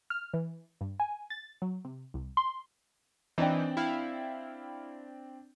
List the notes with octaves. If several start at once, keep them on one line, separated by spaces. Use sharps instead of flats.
F6
E3
G2
G#5
A6
F#3
C3
C2
C6
E3 C4 D4 D#4 G5
E4 F5